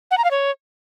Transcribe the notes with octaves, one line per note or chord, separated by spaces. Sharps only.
F#5
A#5
F5
C#5